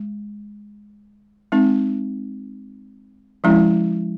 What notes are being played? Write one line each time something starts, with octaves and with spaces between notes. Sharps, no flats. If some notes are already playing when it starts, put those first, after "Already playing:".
Already playing: G#3
G#3 C4 D#4
F3 G#3 C#4 E4